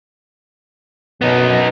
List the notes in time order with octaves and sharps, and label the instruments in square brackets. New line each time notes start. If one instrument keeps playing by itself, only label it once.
[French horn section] F#2 B2 [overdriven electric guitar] B3 D#4